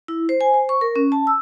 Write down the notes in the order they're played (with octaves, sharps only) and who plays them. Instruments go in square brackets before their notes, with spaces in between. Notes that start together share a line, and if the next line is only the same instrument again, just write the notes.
[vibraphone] E4
C5
G#5
C5
C#6
A#4
C#4
A5
E6